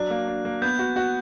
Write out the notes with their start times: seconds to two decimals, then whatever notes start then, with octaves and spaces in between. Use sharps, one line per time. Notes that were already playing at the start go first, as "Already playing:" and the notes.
Already playing: F#3 D4 F#6
0.10 A#3
0.28 D4
0.45 A#3
0.62 B3 G6
0.79 F#4
0.96 F#4